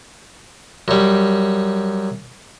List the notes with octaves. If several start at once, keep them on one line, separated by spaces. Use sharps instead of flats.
F#2 G3